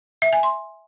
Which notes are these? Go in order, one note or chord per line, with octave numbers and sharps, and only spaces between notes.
E5
G#5
C6